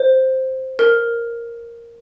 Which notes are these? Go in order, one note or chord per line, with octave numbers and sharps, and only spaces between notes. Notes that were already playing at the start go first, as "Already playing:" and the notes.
Already playing: C5
A#4